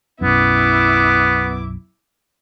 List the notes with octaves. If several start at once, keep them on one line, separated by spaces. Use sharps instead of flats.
B1 F#2 B3 E4 D6